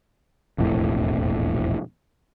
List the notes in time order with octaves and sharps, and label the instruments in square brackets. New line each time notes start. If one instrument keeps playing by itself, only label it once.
[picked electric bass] E1 A#1 F2 A2